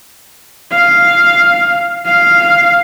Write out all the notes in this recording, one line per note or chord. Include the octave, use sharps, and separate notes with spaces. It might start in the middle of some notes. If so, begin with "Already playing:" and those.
F5
F5